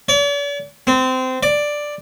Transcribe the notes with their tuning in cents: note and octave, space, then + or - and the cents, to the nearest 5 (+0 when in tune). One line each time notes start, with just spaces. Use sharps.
D5 -45
C4 -20
D5 +5